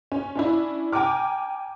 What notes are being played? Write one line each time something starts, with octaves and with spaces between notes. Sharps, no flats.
C#4
C#4 D4 E4
G5 G#5 A#5 D6 F6